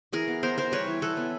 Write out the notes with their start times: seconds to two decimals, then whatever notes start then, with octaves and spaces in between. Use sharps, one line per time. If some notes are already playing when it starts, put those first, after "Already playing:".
0.13 E3 G#4 A#4
0.27 B3
0.43 B3 A#4 C5
0.57 B3 A#4 C5
0.72 G3 B4 C#5
0.87 E3
1.02 E3 A4 B4
1.17 B3